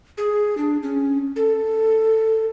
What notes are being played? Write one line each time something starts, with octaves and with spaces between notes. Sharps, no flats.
G#4
D4
C#4
A4